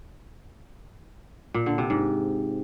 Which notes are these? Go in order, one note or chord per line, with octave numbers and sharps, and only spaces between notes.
A#2
D3
C3
G#2